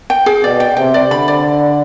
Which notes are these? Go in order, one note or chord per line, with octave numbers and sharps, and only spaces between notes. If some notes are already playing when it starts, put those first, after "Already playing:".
G5
G#4
B2 D5
G5
C3 G5
D5
D3 B5
D5